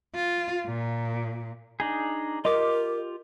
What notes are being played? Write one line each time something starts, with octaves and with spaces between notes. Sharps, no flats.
F4
A#2
D4 D#4 G#4
F4 G4 A#4 D#5 D6